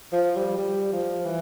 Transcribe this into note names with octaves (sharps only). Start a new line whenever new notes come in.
F3
G3
G3
F3
E3